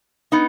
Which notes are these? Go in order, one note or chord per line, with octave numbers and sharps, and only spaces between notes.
B3 D#4